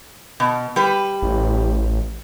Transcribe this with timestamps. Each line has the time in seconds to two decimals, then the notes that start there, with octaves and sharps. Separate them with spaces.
0.40 B2
0.76 G3 B4
1.22 A1